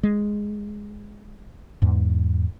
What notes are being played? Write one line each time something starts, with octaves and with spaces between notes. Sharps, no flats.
G#3
E2 G#2